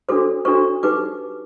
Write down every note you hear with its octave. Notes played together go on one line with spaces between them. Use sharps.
D4 F#4 A4 C5 D6
D4 F#4 A4 C5 C#6
D#4 G4 B4 D6